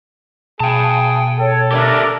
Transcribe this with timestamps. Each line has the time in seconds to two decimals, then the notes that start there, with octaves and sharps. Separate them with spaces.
0.60 B2 G#4 G5 A5
1.39 A4 C#5
1.71 D4 G4 A#4 D5 E5